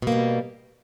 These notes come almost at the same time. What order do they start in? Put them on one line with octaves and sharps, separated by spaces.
B2 A#3 G3